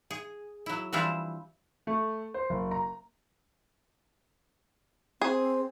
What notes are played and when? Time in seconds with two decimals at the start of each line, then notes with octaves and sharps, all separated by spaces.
0.11 G#4
0.66 F#3 E4
0.93 E3 F3 G3 C4 D4 E4
1.87 A3
2.34 C5
2.50 F#1
2.71 A#5
5.21 C4 G#4